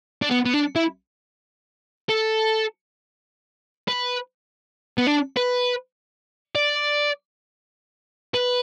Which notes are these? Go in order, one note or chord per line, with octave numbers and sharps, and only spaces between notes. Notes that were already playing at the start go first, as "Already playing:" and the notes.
D4
B3
B3
D4
E4
A4
B4
B3
D4
B4
D5
B4